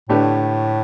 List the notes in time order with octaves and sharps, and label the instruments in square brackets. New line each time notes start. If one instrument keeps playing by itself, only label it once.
[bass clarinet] A2 [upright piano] D3 A3 D4 G4 B4